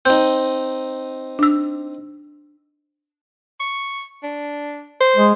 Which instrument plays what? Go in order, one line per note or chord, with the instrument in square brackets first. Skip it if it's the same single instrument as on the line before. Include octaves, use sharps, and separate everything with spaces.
[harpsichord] C4 D#4 [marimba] G6
[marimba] D4 E6
[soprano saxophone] C#6
D4
C5
[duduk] G#3